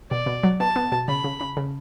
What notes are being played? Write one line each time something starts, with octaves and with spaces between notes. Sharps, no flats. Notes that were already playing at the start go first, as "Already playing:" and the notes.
B2 D5
B2
F#3
B2 A5
B3
B2
C#3 B5
C#3
C#3
C#3